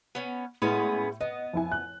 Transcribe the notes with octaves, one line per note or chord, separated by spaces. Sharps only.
B3 C#4
A2 G#3 B3 C#4
B3 D#5
F2 E4 G#5
F#6